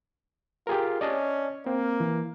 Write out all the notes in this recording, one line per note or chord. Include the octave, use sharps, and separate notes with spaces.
F4 G4 G#4 A#4
C#4 D5 D#5 A5
A#3 C4
E3